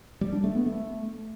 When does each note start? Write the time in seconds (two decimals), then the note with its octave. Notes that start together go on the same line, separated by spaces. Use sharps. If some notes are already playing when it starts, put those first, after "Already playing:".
0.21 G3
0.32 D4
0.44 A3
0.55 B3
0.66 A3